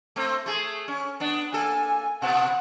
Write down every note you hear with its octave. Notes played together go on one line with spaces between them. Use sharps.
A3 C4
A3 G#4
C#4
B3 D4
A#3 A4 G#5
B2 B3 F#5